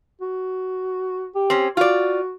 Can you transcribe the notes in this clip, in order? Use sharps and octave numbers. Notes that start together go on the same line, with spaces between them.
F#4
G4
C4 C#4
F4 F#4 D5